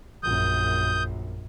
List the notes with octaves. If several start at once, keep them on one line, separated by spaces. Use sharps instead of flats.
A#1 F#2 D#6 G6